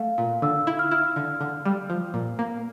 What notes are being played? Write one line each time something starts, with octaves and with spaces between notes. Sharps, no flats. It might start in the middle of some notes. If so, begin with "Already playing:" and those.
Already playing: A3 F5
A#2
D3 E6
E4
F6
E4
D3
D3
G3
F3
A#2
A#3